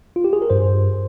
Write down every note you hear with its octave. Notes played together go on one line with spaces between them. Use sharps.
F4
G4
G#4
A#4
G2 C5